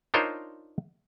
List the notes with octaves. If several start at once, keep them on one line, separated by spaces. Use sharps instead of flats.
D4 D#4 F4 A#4 C5 C#5